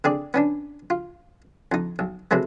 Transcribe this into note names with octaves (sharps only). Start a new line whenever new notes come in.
D3 C4 G#4 D5
B3 C#4 D4
F4
F2 D#4
B1
C3 F#3 G#3 A3 B3